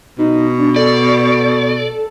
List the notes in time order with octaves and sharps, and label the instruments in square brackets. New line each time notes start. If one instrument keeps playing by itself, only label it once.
[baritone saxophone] B2 [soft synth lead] D#4
[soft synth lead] D4
[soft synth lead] A4 [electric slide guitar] D5